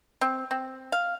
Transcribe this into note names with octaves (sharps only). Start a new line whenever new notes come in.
C4
C4
F5